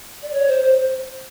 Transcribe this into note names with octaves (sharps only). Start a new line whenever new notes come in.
D5
C#5
C5
C5